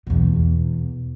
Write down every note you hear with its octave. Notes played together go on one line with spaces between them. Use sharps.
E2 B2